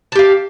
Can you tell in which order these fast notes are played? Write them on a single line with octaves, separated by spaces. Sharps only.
A5 G4 F5